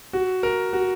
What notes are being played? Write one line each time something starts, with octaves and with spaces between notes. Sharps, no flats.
F#4
A#4
F#4